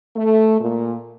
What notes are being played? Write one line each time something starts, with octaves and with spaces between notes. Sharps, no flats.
A3
A#2